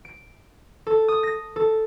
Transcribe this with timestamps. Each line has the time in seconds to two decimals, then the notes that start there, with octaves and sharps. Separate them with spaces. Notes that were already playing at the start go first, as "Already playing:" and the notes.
0.05 D7
0.87 A4
1.08 D#6
1.23 A#6
1.56 A4